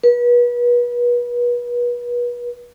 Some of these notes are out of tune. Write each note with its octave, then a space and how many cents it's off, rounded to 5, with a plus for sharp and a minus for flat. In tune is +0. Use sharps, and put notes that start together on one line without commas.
B4 -35